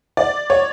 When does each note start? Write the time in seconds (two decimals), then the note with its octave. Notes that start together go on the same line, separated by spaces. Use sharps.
0.17 D5
0.50 C#5